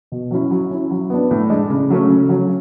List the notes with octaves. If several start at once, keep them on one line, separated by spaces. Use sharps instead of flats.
B2
F#3 C#4 E4
F#3
C#4 E4
F#3
B3 D4
A2
G#3 D4
C#3
F#3 A3 C#4
C#3
F#3 C#4